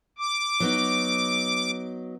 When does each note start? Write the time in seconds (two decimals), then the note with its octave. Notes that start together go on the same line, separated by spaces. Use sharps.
0.19 D6
0.60 F#3 B3 D#4